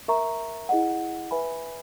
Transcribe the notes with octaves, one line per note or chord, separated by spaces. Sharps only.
A#4 E5 A#5 C#6
E4 G#4 D#5 F#5
B4 E5 G#5 B5